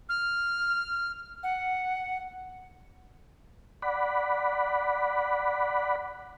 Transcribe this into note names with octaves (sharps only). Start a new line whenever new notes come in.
F6
F#5
D5 F#5 B5